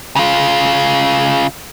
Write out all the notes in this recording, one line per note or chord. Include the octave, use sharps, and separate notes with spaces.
C#3 F4